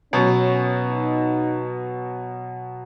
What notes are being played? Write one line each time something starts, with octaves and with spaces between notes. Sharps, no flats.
B2 F#3 B3 C#4
D#4